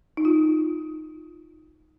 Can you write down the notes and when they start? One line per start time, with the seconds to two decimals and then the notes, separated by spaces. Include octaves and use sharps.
0.17 D#4
0.25 F4